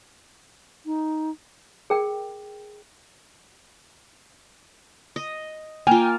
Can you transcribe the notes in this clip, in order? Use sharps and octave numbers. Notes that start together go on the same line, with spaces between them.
D#4
G#4 A#4 G5
D#5
A#3 F4 G5 G#5